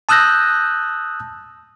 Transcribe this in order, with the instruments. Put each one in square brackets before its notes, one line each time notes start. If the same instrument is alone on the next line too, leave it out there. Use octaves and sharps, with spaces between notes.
[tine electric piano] A5 D#6 E6 F#6 G6 A#6